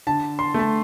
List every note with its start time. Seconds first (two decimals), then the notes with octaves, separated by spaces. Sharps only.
0.07 D3 A5
0.39 C6
0.54 A3
0.59 A5